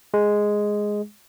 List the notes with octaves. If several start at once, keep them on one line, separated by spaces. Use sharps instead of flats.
G#3